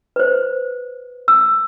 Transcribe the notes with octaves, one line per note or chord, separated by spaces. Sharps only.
B4 C5
E6